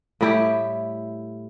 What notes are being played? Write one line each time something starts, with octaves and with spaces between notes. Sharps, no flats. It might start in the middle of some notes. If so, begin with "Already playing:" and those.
A2 G3 E4 G4